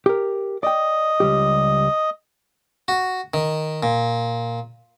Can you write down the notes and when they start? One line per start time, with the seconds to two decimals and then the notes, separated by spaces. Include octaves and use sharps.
0.06 G4 A#4
0.63 D5 D#5 G5
1.20 C#2 G3 G4
2.88 F#4
3.34 D#3
3.83 A#2